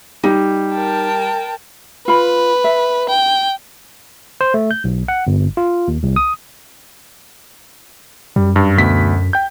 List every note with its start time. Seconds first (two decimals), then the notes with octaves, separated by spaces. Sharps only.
0.24 G3 D#4
0.73 A#4 G5 A5
2.08 F4 B4 B5
2.64 E5
3.09 G5
4.41 C5
4.54 A3
4.71 G6
4.84 B1
5.08 F#5
5.27 G1
5.57 F4
5.88 D#2
6.03 C2
6.16 D#6
8.36 F#2 G3
8.56 G2
8.78 D2 B2 B6
9.33 G5 G6